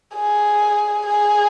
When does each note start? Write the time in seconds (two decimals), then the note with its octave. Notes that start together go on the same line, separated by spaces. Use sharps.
0.16 G#4
1.06 G#4